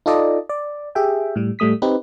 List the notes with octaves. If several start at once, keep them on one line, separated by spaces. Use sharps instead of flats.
D#4 F4 A4 D5 D#5
D5
G4 G#4 E5 G5
A2 G3
A2 G3 A3 D#6 B6
C4 D#4 G4 B4